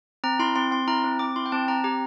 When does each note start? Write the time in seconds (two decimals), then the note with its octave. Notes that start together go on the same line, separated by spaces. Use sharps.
0.24 C4 A#5
0.39 E4 C6
0.56 C4 C6
0.71 C4 C6
0.87 E4 A#5
1.04 C4
1.19 C4 D6
1.36 E4 C6
1.46 G5
1.52 C4 A5
1.68 C4 A#5
1.84 G4 A#5